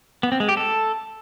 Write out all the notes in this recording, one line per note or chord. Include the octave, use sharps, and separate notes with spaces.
B3
C4
G#3
G4
A4